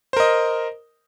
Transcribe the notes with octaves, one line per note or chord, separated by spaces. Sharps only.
A#4 C5 D#5